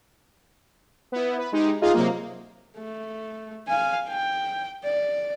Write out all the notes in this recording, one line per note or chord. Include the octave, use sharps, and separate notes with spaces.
B3 E4
B4
G#3 D#4 G4
D#4 F4 G#4 D#5 F5
C3 F#3 A#3
A3
F5 G#5
G5
D5